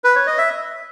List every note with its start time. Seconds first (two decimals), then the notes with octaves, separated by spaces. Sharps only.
0.04 B4
0.16 C#5
0.27 D#5
0.38 E5